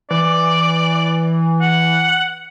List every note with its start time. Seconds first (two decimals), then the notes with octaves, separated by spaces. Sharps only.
0.11 E3 D5
1.61 F#5